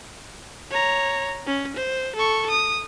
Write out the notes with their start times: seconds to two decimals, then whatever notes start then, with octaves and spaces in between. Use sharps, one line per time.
0.71 C#5 A#5
1.47 C#4
1.77 C5
2.16 A4 C#6
2.51 D#6